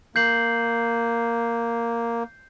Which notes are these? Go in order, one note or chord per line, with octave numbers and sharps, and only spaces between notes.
A#3 G6 C7 F#7